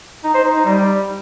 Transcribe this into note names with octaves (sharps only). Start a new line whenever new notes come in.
D#4
C5
D#4
D#4
G3